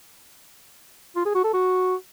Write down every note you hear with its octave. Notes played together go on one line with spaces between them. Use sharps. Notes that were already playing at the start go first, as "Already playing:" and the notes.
F4
G#4
F#4
A4
F#4